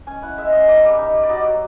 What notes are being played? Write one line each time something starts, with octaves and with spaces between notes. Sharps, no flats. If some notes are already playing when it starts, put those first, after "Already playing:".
C#4 G#5
E4 F#5
G#3 E5
C#4 D#5
A#3 E5
G3
D#4
G3
D5
F#3 D#5
F#3